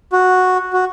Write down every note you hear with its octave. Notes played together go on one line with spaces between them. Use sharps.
F#4
F#4